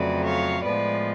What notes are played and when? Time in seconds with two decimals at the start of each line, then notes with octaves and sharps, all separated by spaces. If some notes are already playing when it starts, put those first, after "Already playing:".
Already playing: F2 C#3 F#3 A3 B4 D5
0.25 C#5 F5
0.64 A2 F3 G#3 B3 B4 D5